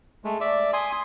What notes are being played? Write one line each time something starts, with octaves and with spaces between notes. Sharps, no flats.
G#3 A3
D5 E5
G#5 C6 D#6